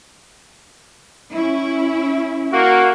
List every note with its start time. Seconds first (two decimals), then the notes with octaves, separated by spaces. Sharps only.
1.33 C#4 E4
2.53 A#3 F#4